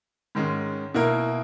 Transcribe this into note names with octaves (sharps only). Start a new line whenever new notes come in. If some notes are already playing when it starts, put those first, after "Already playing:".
G#2 D#3 G#3 C#4
B2 A#3 E4 A#4